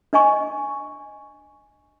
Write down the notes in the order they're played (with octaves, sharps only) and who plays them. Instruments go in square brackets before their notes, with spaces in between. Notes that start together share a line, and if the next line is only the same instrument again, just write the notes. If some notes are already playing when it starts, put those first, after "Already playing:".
[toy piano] D4 D#5 G#5 C#6